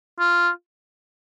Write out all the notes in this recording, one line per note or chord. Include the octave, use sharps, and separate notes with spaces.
F4